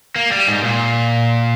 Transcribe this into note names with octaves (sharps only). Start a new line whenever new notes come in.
A#3
G3
G#2
A#2